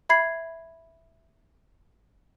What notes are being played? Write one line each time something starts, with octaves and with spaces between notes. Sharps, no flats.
E5 B5 G#6 C7